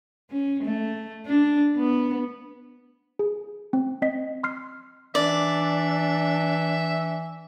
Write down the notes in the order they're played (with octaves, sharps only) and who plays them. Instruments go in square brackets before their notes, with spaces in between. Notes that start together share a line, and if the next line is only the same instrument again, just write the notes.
[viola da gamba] C#4
A3
D4
B3
[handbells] G#4
C4
C4 D#5 B6
C6 F6 C7
[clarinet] E3 [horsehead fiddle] D4 [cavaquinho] D5 [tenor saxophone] E5